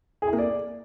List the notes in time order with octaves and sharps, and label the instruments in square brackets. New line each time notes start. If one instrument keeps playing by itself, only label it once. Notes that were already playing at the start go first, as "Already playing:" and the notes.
[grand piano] G#4
E4
A#3
D5